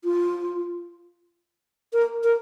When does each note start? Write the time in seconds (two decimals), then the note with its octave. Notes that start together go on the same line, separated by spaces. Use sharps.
0.04 F4
1.93 A#4
2.24 A#4